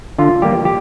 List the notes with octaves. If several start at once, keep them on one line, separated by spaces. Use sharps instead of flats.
D3 F4
G3 A#3 G4
G4